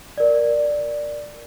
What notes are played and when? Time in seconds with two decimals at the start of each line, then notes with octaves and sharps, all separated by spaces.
0.18 A#4 D5